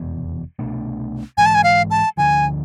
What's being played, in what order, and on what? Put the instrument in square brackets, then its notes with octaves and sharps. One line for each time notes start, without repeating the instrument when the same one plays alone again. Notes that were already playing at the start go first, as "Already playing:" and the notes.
Already playing: [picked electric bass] F1 E2 B2
C2 B2 A3 D4
[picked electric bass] G#2 E3 G#3 [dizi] G#5
[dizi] A5
G#5
F5
A5
[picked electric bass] D2 D3 F3 [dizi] G#5